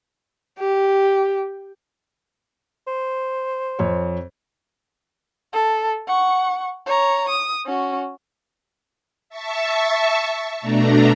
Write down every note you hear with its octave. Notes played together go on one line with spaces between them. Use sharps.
G4
C5
F2 C#5
A4
F#5 C#6
C#5 A#5
D#6
C#4 F#4
E5 A5 C#6
B2 A3 D4 A#5